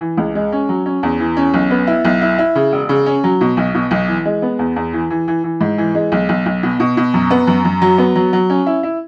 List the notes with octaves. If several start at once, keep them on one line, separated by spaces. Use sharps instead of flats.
E3
C#2
G#3
C#4
F#3
C#4
E2
E3
C#4
B1
B3
E4
B1
E4
E4
C#3
E1
C#3
C#4
F#3
B2
B1
B2
B1
E3
G#3
B3
E2
E2
E3
E3
E3
E3
G#2
E3
G#3
B1
B1
B1
B2
B2
B2
F#2
B3
F#2
F#2
F#3
B3
F#3
F#3
C#4
E4
E4